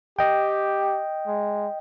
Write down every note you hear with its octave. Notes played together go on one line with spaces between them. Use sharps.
G4 D#5 G5
G#3